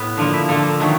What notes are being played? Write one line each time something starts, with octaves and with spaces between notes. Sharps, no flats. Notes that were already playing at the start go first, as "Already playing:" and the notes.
Already playing: A2 B3
D3 F3 A#3
E4
D3 F3 A#3 A4
D#3 F#3 A3